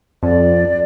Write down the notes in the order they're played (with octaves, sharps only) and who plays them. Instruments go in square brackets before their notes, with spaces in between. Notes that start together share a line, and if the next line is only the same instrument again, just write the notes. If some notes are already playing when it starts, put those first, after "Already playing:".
[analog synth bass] F2 [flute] D5